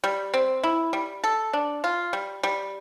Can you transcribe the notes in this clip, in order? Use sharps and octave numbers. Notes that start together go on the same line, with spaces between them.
G3
C4
E4
G3
A4
D4
F4
G3
G3